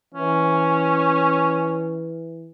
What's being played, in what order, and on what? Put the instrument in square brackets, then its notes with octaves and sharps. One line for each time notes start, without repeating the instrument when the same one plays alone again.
[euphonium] E3 [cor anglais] C#4